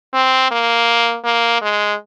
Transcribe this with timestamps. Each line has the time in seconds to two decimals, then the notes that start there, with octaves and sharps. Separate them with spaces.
0.14 C4
0.51 A#3
1.24 A#3
1.62 G#3